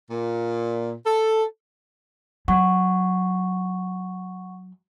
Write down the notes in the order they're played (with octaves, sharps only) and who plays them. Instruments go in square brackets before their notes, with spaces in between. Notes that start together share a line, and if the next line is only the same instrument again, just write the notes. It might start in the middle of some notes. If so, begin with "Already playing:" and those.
[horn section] A#2
A4
[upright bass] F#3 [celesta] F#5 C#6